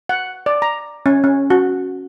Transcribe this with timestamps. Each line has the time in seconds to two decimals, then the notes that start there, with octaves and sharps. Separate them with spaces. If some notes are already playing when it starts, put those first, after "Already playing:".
0.09 F#5
0.46 D5
0.62 A#5
1.06 C#4
1.24 C#4
1.50 F#4